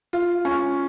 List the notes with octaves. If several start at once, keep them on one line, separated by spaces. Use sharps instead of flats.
F4
C#4